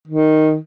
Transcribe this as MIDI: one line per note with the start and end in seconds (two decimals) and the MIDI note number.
0.07 0.56 51